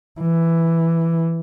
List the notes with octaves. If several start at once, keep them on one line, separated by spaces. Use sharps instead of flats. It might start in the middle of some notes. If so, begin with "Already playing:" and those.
E3